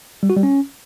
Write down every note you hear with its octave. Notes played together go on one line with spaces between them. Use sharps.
G3
F#4
G3
C#4